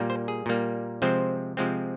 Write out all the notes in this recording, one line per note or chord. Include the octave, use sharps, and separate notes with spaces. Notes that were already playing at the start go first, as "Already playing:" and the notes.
Already playing: A#2 G3 A#3
C5
G#4
A#2 G3 A#3
C3 F3 G#3 C4 C5
C3 F3 G#3 C4